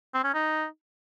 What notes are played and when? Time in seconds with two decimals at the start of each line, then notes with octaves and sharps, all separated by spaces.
0.14 C4
0.24 C#4
0.34 D#4